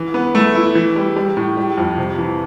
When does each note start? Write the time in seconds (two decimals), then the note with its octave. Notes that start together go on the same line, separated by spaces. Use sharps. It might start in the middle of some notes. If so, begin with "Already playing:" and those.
Already playing: E3
0.14 B3
0.35 A3
0.55 E4
0.75 E3
0.96 G3
1.16 G3
1.37 A2
1.57 G3
1.78 F2
1.98 C3
2.18 E3